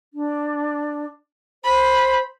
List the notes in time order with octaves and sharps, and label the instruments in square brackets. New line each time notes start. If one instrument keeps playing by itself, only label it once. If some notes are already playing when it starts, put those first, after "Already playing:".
[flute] D4
[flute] C5 [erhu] B5